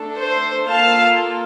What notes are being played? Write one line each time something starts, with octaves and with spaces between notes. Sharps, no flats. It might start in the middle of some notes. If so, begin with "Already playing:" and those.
Already playing: A3 D4 A4
C5
A#3 F4 A4 F5 A5